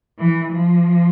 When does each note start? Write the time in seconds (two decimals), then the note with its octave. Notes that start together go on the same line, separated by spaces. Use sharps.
0.18 E3
0.52 F3